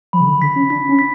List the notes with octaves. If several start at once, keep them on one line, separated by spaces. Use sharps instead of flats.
F3 B5
C#3
D3
D3 B6
C#4
D4 B6
C#4
B6